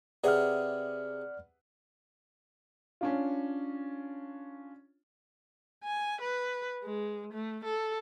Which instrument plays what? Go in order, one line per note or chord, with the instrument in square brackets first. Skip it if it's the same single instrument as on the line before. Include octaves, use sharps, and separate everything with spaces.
[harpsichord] C3 G#4 [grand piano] B4 E5 F#5 [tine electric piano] D5 F6
[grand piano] C#4 D4 F4
[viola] G#5
B4
G#3
A3
A4